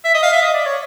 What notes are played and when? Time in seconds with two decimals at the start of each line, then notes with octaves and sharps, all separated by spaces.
0.04 E5
0.14 D#5
0.23 F5
0.33 E5
0.42 D#5
0.54 D5
0.66 C#5